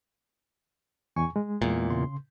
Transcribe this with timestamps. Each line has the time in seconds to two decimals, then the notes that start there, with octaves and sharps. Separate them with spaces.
1.16 E2 G#5 C#6
1.36 G#3
1.62 E2 A#2
1.90 C#3 C6